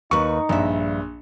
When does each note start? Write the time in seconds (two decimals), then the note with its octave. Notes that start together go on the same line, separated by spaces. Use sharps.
0.11 D#2 D#4 B4 C#6
0.49 A#1 G2 E5